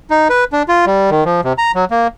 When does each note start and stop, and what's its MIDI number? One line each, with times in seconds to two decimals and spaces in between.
0.10 0.28 63
0.30 0.44 71
0.53 0.63 62
0.68 0.85 65
0.87 1.10 55
1.11 1.24 51
1.25 1.41 53
1.44 1.53 48
1.58 1.72 82
1.75 1.85 54
1.91 2.07 58